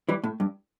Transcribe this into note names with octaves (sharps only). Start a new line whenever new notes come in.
E3 G3
A2
G2